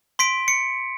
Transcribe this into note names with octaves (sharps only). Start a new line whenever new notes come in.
C6 B6 D7
C#7